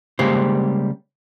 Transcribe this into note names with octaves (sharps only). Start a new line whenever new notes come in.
C#3 G3 G#3 A#3 G4 C5